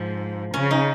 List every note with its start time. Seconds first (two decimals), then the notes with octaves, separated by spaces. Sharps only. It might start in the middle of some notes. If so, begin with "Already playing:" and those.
Already playing: G#2 F3
0.54 C#3 C#4
0.71 D#4